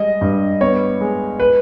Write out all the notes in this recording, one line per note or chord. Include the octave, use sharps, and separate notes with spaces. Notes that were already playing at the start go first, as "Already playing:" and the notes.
Already playing: G3 G#3 D#5
G2
B3 C#5
G#3
B4